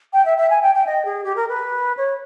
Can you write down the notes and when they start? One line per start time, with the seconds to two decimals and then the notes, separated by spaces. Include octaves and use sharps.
0.13 G5
0.25 E5
0.37 E5
0.50 G#5
0.62 G5
0.74 G5
0.86 D#5
1.05 G#4
1.23 G4
1.36 A#4
1.48 B4
1.97 C#5